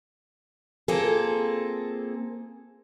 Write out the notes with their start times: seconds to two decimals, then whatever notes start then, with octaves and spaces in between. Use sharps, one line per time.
0.88 A#3 C4 F4 G#4 A4